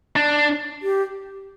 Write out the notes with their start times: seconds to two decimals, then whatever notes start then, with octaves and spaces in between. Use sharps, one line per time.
0.16 D4
0.82 G4